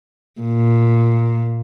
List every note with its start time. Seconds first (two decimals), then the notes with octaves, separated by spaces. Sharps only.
0.41 A#2